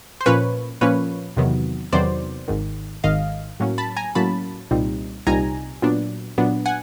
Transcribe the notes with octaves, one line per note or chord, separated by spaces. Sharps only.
C5
A#2 F3 A#3 C#4 B4 C#5
A#2 F3 A#3 C#4 B4 C#5
E2 C3 D#3 F#3 B3
E2 C3 D#3 F#3 B3 C5 D5
G#1 G#2 D#3
G#1 G#2 D#3 D#5 F5
A2 F#3 A#3 C#4
A5 B5
G#5 A#5
A2 F#3 A#3 C#4 A5 B5
C2 A#2 G3 C4 D#4
C2 A#2 G3 C4 D#4 G#5 A#5
A#2 F#3 B3 D4
A#2 F#3 B3 D4
F#5 G#5